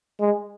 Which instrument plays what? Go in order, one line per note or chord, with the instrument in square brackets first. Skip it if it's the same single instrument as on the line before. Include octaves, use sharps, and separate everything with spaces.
[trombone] G#3